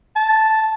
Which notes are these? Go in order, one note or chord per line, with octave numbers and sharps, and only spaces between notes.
A5